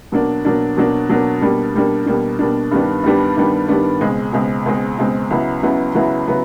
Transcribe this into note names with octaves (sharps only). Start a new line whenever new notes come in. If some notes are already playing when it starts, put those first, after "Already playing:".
B2 F#3 A#3 D4
B2 F#3 A#3 D4
B2 F#3 A#3 D4
B2 F#3 A#3 D4
B2 G3 A#3 D4
B2 G3 A#3 D4
B2 G3 A#3 D4
B2 G3 A#3 D4
G2 D#3 G3 B3 D4
G2 D#3 G3 B3 D4
G2 D#3 G3 B3 D4
G2 D#3 G3 B3 D4
C#2 B2 G#3 C4
C#2 B2 G#3 C4
C#2 B2 G#3 C4
C#2 B2 G#3 C4
C#2 C#3 F#3 B3 E4
C#2 C#3 F#3 B3 E4
C#2 C#3 F#3 B3 E4
C#3 F#3 B3 E4